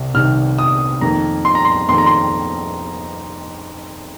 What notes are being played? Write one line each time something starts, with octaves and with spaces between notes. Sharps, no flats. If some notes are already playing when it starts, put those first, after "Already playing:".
Already playing: C2 C3
C2 C3 D#3 F6
D#6
F2 D#3 A#3 A#5
C6
A#5
C6
F2 D#3 A#3 C6
A#5
C6